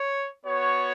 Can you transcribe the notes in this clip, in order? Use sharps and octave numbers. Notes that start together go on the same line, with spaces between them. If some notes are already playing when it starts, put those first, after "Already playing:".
Already playing: C#5
B3 F#4 C#5